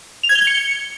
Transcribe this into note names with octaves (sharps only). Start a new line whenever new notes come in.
F7
G#6
G7
G#6
C#7